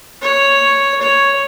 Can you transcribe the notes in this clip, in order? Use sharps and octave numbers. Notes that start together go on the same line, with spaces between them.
C#5
C#5